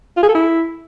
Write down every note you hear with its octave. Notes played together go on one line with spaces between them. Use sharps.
F4
G#4
A4
E4